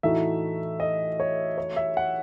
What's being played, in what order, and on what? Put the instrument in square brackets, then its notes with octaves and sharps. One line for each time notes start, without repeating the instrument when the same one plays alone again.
[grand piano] A2 E3 A3 D#4 F#4 [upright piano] E5
[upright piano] D#5
C#5
C#5
E5
F#5